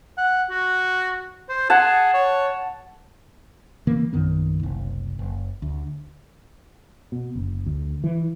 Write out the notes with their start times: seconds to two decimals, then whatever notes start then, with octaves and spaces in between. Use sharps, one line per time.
0.18 F#5
0.50 F#4
1.49 C5
1.70 G#4 F#5 A5
2.14 C#5
3.87 C#3 E3 A#3
4.13 A#1 F#2 D#3 B3
4.59 F#1 C2
5.19 F#1
5.62 D2
7.12 B2
7.35 F#1
7.66 D2
8.04 E3